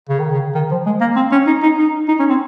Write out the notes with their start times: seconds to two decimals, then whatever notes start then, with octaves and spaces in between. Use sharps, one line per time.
0.09 C#3
0.20 D#3
0.31 C#3
0.55 D#3
0.71 F3
0.86 G#3
1.01 A#3
1.16 C4
1.32 C#4
1.47 D#4
1.63 D#4
1.78 D#4
2.08 D#4
2.20 C#4
2.30 C4